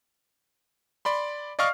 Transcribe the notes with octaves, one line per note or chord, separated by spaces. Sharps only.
D5 B5 C6
D5 D#5 F5 C#6 F6 C7